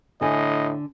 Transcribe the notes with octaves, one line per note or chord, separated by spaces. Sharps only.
A2 D3 D#5 G#5